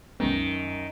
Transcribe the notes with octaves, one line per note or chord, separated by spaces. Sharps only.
C2 F#2 D#3 G#3 B3